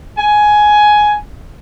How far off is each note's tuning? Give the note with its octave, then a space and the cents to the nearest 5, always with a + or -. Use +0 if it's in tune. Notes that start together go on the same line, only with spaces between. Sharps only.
G#5 +10